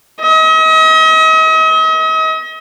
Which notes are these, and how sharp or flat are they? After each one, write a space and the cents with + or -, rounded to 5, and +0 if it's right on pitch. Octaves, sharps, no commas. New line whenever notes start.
D#5 +40